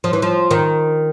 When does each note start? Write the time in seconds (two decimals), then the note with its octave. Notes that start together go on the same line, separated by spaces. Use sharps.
0.04 F3
0.13 E3
0.22 F3
0.51 D#3